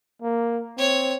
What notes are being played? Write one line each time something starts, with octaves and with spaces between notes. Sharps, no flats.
A#3
C4 C#5